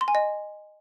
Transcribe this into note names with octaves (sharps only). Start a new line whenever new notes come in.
C6
G#5
D#5